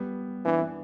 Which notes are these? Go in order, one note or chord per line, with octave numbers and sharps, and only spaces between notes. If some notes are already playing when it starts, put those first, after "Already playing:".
Already playing: G3 B3
E3 B3 D4
B3 D4